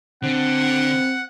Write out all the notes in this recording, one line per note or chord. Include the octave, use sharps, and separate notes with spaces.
D3 C4 F#5